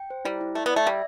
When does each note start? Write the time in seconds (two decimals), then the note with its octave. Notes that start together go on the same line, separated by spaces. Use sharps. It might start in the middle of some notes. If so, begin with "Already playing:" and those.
Already playing: G5
0.10 C5
0.25 G3 E4
0.41 E4
0.55 A3 D5
0.66 B3 D5
0.76 A3
0.86 G3 E5